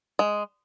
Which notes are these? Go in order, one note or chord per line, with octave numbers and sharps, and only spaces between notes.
G#3